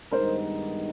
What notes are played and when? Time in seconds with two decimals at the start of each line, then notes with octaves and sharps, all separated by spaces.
0.11 G2 D#3 G#3 B3 D#4 A#4 C5